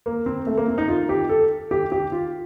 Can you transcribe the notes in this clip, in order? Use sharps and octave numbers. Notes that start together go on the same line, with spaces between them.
A#3
C4
A3
A#3
C4
D#4
F4
G4
A4
G4
G4
F4